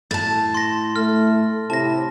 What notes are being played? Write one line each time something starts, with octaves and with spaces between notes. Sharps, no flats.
A2 A5 A6
C6 A#6
A3 F6
A2 C3 E4 A5 A#6